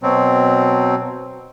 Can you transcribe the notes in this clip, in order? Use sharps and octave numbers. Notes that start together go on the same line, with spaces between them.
B2 F#3 C4